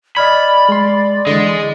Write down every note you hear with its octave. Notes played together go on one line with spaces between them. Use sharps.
D5 D#5 B5 F6 G#6
G#3 C6
D3 E3 G#4 D#5